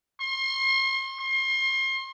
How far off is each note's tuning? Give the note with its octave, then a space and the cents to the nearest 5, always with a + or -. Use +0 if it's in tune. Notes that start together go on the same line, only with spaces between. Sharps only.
C6 +40
C6 +35